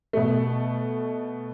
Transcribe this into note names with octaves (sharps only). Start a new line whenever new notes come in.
B2 A3